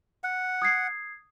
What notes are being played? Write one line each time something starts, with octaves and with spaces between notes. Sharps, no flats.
F#5
D#6 G#6 C7